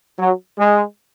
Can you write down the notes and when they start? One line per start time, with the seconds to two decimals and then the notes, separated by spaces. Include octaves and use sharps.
0.18 F#3
0.58 G#3